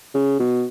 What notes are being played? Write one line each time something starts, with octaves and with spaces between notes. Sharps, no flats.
C#3
B2